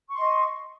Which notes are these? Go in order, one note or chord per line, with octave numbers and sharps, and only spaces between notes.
D#5 C6 C#6